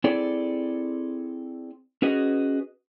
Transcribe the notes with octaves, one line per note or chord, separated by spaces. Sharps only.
C4 E4 G#4 A4 D5
C#4 F#4 G#4 B4 D#5